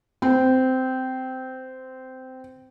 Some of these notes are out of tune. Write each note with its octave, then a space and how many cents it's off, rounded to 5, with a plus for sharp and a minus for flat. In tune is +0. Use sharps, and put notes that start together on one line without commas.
C4 -15